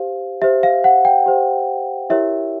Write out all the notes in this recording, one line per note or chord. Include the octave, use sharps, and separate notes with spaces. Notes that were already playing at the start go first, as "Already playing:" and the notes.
Already playing: G4 C5 F5
G4 C5 E5
F5
F#5
G5
G4 C5
E4 G4 A#4 C#5 E5